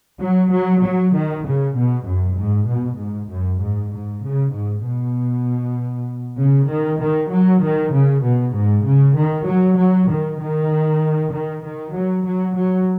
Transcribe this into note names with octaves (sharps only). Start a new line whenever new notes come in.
F#3
F#3
F#3
D#3
C#3
B2
F#2
G#2
B2
G#2
F#2
G#2
G#2
C#3
G#2
B2
C#3
D#3
D#3
F#3
D#3
C#3
B2
G#2
C#3
D#3
F#3
F#3
D#3
D#3
D#3
D#3
F#3
F#3
F#3